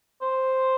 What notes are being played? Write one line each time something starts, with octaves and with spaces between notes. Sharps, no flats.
C5